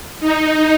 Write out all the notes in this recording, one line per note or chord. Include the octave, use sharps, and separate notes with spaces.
D#4